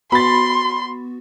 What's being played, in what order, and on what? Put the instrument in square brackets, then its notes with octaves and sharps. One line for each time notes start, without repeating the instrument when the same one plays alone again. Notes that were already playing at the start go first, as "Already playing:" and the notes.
[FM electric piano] B3 F#4 [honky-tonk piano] B5 A6 [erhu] C6